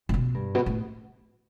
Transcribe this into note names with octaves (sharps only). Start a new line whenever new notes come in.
A2
B2
G2
B2
A2